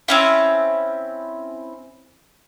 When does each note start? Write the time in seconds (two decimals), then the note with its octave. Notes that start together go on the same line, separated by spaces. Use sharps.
0.08 C4 C#4 E4